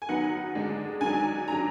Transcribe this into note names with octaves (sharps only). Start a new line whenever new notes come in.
G#5
D#3 F#3 B3 F#5
D3 G#3 D4
D#3 F#3 D4 G#5
F#3 D4 A#5